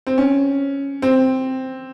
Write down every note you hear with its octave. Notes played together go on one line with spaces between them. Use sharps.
C4
C#4
C4